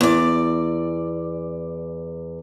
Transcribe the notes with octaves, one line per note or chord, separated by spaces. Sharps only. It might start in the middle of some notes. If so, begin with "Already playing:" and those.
E2 D5